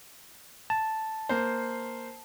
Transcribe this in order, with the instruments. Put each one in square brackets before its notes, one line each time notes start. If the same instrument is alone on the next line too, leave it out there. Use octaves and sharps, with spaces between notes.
[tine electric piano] A5
[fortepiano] A#3 C5